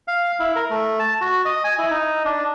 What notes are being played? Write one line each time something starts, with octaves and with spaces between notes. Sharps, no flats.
F5
E4
A#4
A3
A5
F#4
D#5
G#5
E4
D#4
D4